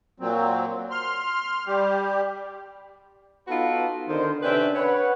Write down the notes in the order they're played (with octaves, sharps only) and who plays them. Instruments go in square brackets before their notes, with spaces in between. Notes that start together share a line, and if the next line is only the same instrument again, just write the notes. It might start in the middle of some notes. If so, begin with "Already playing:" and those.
[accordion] A#2 F#3 C4
C6 F6
G3 G4
[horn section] B3 D#4 F4 F#4 A4 B4
D3 D#3 C5
C3 C#4 D4 B4 E5 G5
B4 C#5 F#5